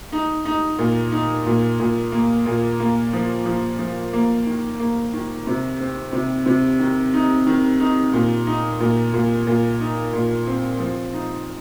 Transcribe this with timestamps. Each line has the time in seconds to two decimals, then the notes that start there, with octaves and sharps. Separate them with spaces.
0.12 D#4
0.45 D#4
0.79 A#2
1.12 D#4
1.46 A#2
1.79 A#2
2.12 A#3
2.46 A#2
2.80 A#3
3.13 F3
3.46 F3
3.79 F3
4.13 A#3
4.47 D#3
4.80 A#3
5.13 D#3
5.47 C3
5.80 C4
6.13 C3
6.46 C3
6.80 D#3
7.14 D#4
7.47 D#3
7.80 D#4
8.13 A#2
8.47 D#4
8.80 A#2
9.13 A#2
9.47 A#2
9.80 D#4
10.13 A#2
10.47 C4
10.80 F3
11.13 D#4